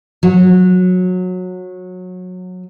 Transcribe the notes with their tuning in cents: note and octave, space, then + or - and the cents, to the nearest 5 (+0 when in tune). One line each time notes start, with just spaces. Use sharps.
F#3 -20